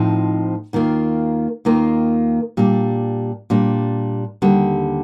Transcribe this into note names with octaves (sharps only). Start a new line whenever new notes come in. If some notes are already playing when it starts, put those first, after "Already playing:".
Already playing: A2 F3 C4 D#4
D#2 D#3 A#3 F4
D#2 D#3 A#3 F4
A#2 G3 D4
A#2 G3 D4
D#2 D3 G3